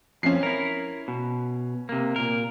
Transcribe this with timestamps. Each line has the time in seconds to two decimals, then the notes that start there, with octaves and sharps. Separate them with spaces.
0.23 F2 F3 C#4 C7
0.43 E4 A#4
1.08 B2
1.89 C3 A#3
2.16 A#2 A#4